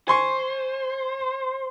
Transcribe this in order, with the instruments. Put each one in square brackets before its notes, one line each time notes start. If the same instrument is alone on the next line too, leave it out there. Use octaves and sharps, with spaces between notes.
[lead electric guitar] C5 [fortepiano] G#5 C6 C#6